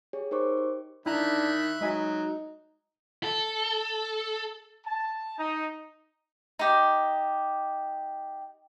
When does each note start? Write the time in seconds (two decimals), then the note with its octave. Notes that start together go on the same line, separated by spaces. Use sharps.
0.13 G4 G#4 C#5
0.31 D#4 A#4 C5 C#6 D6
0.57 G4
1.06 D#3 D4 E4 E5 A#5 B5 F#6
1.81 F#3 G#3 D#4 D#5 G#5
3.23 A4
4.85 A5
5.38 D#4
6.59 D#4 G4